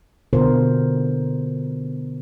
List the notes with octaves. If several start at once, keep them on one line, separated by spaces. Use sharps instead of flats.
B2 D3 F4 A#4 C5